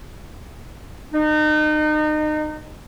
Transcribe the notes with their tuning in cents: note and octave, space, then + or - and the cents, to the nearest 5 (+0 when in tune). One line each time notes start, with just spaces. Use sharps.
D#4 -30